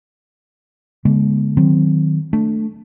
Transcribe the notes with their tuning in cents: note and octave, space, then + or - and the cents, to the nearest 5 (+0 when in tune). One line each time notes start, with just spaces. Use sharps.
D3 -45 G#3 +0 B3 -40
D#3 +0 F#3 +0 C4 -5
A3 +0 D4 +0